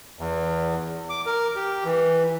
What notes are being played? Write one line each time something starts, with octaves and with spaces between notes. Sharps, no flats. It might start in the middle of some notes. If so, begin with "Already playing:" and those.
E2
D6
A#4
G4
E3